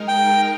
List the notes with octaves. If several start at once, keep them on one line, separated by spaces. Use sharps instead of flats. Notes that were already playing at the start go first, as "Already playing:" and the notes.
Already playing: G#3 D#4 A#4
G5